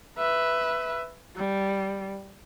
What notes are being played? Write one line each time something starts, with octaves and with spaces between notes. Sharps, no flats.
B4 E5
G3